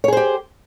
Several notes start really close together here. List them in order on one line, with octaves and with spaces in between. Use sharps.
C#5 G#4 C5 G4